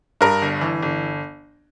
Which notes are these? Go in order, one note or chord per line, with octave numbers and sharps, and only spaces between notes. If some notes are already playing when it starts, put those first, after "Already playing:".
G2 A#4
G1
E3
G1